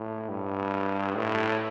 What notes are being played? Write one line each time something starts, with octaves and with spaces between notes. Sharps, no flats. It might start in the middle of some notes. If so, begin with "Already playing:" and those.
Already playing: A2
G2
A2